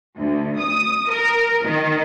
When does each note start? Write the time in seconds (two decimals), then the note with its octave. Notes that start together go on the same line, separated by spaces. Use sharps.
0.18 D2
0.58 D#6
1.10 A#4
1.65 D#3